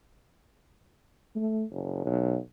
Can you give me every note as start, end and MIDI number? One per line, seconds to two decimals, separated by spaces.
1.36 1.64 57
1.71 2.03 30
2.05 2.37 35